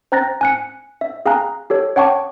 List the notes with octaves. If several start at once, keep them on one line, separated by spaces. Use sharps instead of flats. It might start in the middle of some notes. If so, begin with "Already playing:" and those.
C5 G5 A#5 F#6 A6 A#6
G#5 F#6 C#7
E5
G#4 F5 G5 G#5 A#5 F#6
G4 A4 C#5
C#5 F#5 G5 A5 C#6 D6